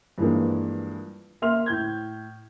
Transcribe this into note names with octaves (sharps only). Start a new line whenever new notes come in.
G2 E3 F3 G#3 A#3
A#3 E5 C6 F6 F7
A2 G6 G#6